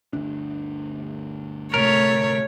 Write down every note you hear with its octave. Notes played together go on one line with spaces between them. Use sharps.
G1 D2 D4
D1 G1 C3 A3 A#4 C#5